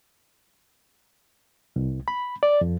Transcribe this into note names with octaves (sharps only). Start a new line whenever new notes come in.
C2
B5
D5
F2